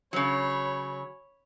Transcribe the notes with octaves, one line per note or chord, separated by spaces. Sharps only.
C#3 F#3 C#5 B5